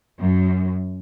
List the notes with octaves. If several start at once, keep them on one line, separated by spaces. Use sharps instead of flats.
F#2